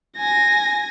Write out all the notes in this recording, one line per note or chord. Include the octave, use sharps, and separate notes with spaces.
G#5 A#6